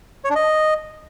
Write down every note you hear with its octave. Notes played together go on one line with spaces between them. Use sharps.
C#5
D4
D#5